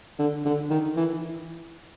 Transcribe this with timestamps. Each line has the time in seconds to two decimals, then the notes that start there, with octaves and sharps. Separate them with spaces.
0.19 D3
0.46 D3
0.71 D#3
0.97 E3